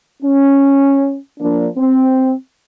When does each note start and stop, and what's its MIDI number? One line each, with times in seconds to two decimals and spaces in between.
0.22 1.17 61
1.39 1.67 53
1.39 1.67 58
1.39 1.67 62
1.77 2.32 60